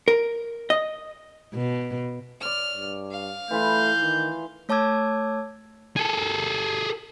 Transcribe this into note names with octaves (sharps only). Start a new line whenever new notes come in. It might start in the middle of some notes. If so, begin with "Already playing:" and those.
A#4
D#5
B2
C#5 D5 F6
G2
F5
E3 A3 F4 B5 G6
D#3
A3 C#5 A5 D6 E6 G#6
G#4 A4